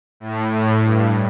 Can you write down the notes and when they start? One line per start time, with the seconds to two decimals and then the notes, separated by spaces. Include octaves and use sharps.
0.20 A2
0.51 A2
0.82 G2